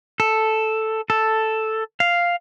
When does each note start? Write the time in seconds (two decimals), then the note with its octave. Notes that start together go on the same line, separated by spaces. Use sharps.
0.20 A4
1.10 A4
2.00 F5